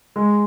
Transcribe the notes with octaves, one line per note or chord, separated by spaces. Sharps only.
G#3